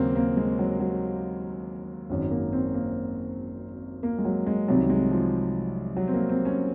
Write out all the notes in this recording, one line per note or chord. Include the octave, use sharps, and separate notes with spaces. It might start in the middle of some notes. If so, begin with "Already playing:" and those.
Already playing: D#2 C#3 F#3 A#3 C4
A#3
G#3
F#3
F#3
G#1 F#2 D#3
A#3
C4
A#3
A#3
G#3
F#3
G#3
C2 C3 D#3 F#3
G#3
F3
F#3
C4
A#3
C4
C#4